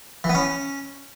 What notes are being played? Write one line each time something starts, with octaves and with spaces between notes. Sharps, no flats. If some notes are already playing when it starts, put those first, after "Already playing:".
E3
B3
C#4